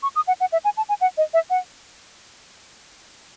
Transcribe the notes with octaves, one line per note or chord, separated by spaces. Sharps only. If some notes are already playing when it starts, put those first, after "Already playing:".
C#6
D#6
F#5
F#5
E5
G#5
A5
G#5
F#5
D#5
E5
F#5